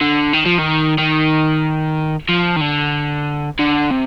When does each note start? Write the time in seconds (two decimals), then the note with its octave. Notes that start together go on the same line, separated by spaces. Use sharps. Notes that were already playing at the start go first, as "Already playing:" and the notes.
0.01 D3
0.33 D#3
0.46 F3
0.59 D#3
0.98 D#3
2.29 F3
2.56 D#3
2.61 D3
3.59 D3
3.90 C3